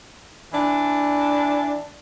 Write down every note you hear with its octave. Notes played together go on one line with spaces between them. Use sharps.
E3 D4